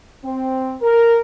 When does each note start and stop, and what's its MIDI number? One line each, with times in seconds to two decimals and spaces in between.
0.24 0.74 60
0.81 1.20 70